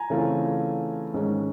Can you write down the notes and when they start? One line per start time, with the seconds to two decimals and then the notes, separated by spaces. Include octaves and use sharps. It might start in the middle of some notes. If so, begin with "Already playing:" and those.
Already playing: G#5 A#5
0.10 C#3 E3 A3 C4 F4
1.14 G#2 D#3 G#3 C#4